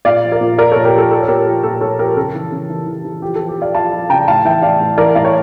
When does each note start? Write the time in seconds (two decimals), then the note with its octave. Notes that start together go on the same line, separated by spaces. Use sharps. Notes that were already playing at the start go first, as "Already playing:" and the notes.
0.05 A#2 D5 F5
0.24 F3
0.32 A#4 D5
0.41 A#2
0.58 F3 A#4 D5
0.71 A#2 A4 C#5
0.85 G4 A#4
0.94 F3 A4
1.11 F3 A4
1.20 C#5
1.28 A#2 G4 A#4
1.46 F3 G4
1.64 A#2 A4
1.81 A#2 A4 C#5
1.99 F3 G4 A#4
2.17 C#3 A4
2.35 E3
2.52 C#3
2.69 E3
2.87 E3
3.05 E3
3.22 F3 G4
3.36 A4
3.40 F3
3.49 G4
3.58 F3 D5 F5
3.75 F3 F5 A5
3.93 F3
4.10 C#3 G5 A#5
4.27 A2 F5 A5
4.45 E3 E5 G5
4.62 A2 D5 F5
4.80 A2
4.98 E3 A#4 D5
5.15 A2 D5 F5
5.25 C#5